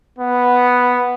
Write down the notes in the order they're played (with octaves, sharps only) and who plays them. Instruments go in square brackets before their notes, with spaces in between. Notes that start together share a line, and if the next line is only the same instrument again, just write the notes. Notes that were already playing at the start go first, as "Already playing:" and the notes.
[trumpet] B3